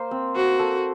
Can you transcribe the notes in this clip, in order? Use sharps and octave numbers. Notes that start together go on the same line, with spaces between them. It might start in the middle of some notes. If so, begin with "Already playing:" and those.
Already playing: A#3 C5
C4
F#4 C5
A4